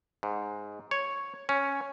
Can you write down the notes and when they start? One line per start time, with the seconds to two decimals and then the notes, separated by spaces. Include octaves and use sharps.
0.23 G#2
0.91 C#5
1.49 C#4